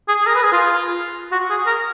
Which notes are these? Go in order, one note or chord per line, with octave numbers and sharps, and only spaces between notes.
G#4
G#4
A#4
B4
G#4
F4
F#4
G#4
A#4